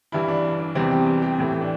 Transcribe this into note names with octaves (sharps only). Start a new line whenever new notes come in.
G2 E3 G3 E4
D4
D4
D4
E2 C3 E3 G3 C4
G4
G4
G4
A2 E3 A3
D4